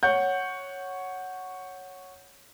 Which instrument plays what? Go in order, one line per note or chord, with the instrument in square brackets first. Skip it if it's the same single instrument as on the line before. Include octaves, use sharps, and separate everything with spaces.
[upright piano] C#5 F#5 G6